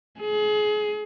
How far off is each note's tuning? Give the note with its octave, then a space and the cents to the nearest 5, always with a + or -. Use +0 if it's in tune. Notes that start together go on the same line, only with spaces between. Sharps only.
G#4 +30